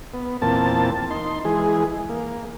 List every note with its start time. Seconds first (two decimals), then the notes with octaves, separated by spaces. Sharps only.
0.14 B3
0.42 E2 A#2 A#3 C4 A5
1.11 D#4 C6
1.45 E3 G#3 G#4
2.09 A#3